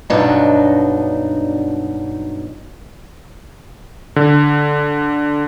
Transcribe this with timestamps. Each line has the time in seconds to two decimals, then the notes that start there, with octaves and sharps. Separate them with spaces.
0.10 G2 B2 F#3 B3 D4 D#4
4.16 D3